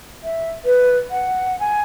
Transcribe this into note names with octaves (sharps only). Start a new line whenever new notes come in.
E5
B4
F#5
G#5